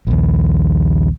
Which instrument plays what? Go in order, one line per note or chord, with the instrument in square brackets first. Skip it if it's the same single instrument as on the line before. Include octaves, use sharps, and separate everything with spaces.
[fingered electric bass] A#1 D#2